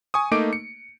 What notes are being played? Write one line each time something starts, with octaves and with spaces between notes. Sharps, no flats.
G#5 C#6 D#6
A3 A#3 D#4 D6 D7
C#7